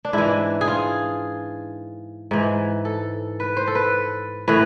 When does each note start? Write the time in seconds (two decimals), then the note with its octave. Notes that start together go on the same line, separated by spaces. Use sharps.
0.05 D4
0.13 G#2 E3 E4
0.61 G#4
0.68 F4
2.31 G#2 E3
2.85 A4
3.40 B4
3.57 C5
3.67 A4
3.75 B4
4.48 A2 E3 B4